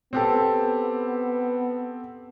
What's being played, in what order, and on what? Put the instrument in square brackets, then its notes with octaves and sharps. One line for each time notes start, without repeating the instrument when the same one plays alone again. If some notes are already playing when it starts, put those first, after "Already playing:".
[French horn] B3 [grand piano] C4 G4 A4